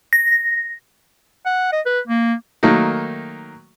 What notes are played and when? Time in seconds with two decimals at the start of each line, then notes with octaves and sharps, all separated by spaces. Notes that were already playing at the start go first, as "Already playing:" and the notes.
0.13 A#6
1.45 F#5
1.72 D#5
1.86 B4
2.07 A#3
2.63 D#3 F#3 A3 A#3 D#4